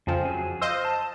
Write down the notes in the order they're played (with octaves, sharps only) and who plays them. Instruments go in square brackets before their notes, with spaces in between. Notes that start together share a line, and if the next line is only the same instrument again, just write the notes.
[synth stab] F2 F3 [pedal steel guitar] C#3 C4
[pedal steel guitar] F#3 G#4
[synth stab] C5 D#5 [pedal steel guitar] F5 E6
[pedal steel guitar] A5